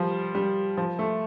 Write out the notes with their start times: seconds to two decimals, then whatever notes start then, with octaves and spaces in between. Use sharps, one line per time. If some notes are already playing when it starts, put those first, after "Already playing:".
Already playing: F3 G3
0.35 G3
0.77 F3
0.99 A3